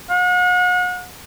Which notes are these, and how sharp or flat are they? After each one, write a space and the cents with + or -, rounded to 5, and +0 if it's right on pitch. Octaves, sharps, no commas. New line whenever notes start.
F#5 -40